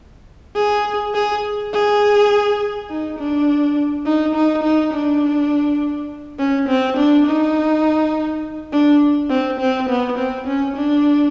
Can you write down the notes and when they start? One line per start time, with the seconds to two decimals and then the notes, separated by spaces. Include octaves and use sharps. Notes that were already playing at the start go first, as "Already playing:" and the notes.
0.55 G#4
1.14 G#4
1.73 G#4
2.90 D#4
3.19 D4
4.06 D#4
4.35 D#4
4.63 D#4
4.93 D4
6.39 C#4
6.69 C4
6.97 D4
7.26 D#4
8.73 D4
9.30 C4
9.60 C4
9.89 B3
10.18 C4
10.47 C#4
10.76 D4